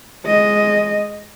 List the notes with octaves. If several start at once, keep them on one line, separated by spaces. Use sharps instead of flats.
G#3 D#5